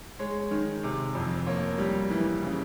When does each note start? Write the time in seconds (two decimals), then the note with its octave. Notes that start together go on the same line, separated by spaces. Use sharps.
0.19 G#3 C#5
0.51 D#3
0.83 C3
1.15 F2
1.46 A#3 C#5
1.78 G3
2.10 E3
2.42 C#3